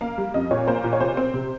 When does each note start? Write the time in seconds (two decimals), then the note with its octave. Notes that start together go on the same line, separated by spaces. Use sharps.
0.01 A#3 F5
0.18 G3
0.34 F2 D#5
0.51 A#2 C#5
0.67 A#3 C5
0.84 A#2
0.93 C#5
1.00 C3 C5
1.17 C4
1.34 C3